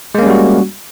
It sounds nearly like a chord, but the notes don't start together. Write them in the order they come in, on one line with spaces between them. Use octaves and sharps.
G#3 A#3 C#4 G3 F#4